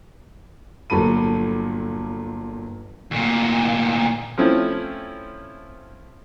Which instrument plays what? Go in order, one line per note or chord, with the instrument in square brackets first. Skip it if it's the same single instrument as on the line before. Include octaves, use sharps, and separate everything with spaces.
[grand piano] G1 A#2 F#3 A4 B5 D#7
[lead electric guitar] D2 A#2
[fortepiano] F3 A3 C4 C#4 E4 F4